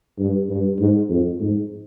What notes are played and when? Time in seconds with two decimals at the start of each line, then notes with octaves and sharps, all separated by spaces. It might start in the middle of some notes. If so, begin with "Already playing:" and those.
0.19 G2
0.50 G2
0.79 G#2
1.10 F2
1.40 G#2